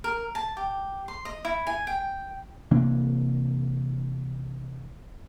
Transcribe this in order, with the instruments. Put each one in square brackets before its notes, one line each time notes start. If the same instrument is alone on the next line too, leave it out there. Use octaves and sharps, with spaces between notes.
[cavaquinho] A#4
A5
G4
C6
D#5
E4
G#5
G5
[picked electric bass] C3 E3 A#3 D4